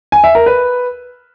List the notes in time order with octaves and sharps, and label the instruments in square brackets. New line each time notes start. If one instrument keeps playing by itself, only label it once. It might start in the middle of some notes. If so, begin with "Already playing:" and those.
[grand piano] G#5
E5
A#4
B4